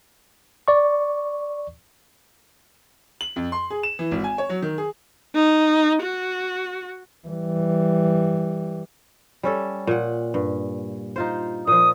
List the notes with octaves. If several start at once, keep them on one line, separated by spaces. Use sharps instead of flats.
D5 C#6
F#7
F2
C6
G#4
E7
E3
G#1
G#5
C#5
F#3
D#3
G#4
D#4
F#4
E3 G3
G3 C#4 A4
A#2 F#5
G2
D#4 F4 C5
A#2 F3 D#6